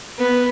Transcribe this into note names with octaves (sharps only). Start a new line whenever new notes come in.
B3